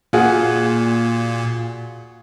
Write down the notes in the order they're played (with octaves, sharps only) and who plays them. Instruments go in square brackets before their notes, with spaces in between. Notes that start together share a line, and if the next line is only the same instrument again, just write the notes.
[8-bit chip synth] A#2 [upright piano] F4 F#4 G#4